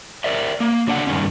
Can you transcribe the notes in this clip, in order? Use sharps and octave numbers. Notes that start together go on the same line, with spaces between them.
A#4 D5 E5
A#3
F#3 D4 D5 F#5
G2 B2 D#3 C#4